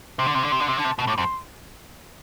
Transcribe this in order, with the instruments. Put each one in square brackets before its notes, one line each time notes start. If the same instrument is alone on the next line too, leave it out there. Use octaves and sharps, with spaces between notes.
[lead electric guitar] C3 [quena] C6
[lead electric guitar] D3
C3
D3
C3
[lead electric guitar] D3 [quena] C6
[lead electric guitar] C3
[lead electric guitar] D3 [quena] A5
[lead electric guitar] C3
[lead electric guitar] B2 [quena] A5
[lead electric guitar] A2 [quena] D6
[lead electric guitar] F2 [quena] C6